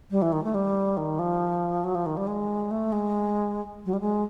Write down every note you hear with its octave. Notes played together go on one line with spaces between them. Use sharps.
G3
E3
D#3
A3
G3
D#3
F3
F#3
F3
D#3
G3
G#3
A3
G#3
F#3
G3
G#3